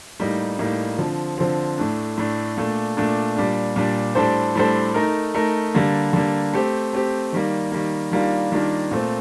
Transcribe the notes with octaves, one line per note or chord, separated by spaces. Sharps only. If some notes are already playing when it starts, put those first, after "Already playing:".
A2 G3 A#3 D#4
A2 G3 A#3 D#4
D3 F3 C4
D3 F3 C4
A2 A3 D4
A2 A3 D4
A#2 A3 D4
A#2 A3 D4
A#2 G3 D4
A#2 G3 D4
A2 G3 D4 A4 C5
A2 G3 D4 A4 C5
A3 D#4 A#4
A3 D#4 A#4
D3 G3 A#3
D3 G3 A#3
A3 C4 G4
A3 C4 G4
D#3 G3 A#3
D#3 G3 A#3
D#3 G3 A#3 D4 F4
D#3 G3 A#3 D4 F4
A#2 A3 C4